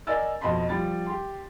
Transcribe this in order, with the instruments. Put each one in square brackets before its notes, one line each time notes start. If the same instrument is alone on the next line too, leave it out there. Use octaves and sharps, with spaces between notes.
[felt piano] A#4 D5 D#5 G#5 E6 A6
F2 B2 D#5 A5 B5 C6
F3 G3 A6
G4 C6